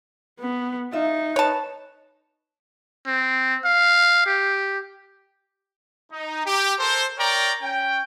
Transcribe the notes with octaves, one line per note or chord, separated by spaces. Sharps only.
B3
D#4 F4 E5
B4 C#5 A5
C4
F5
G4
D#4
G4
A4 A#4 C5
A#4 C#5 D5 G5 A#5
C#4 G5